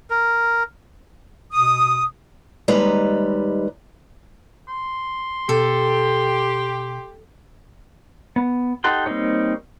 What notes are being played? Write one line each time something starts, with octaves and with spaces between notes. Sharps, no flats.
A#4
B2 D#6
D#2 G3 G#3 D#4 B4 A#5
C6
B2 G4 A4
B3
D#4 G4 A4 F#5 C6
G3 A#3 C4 D#4 C#5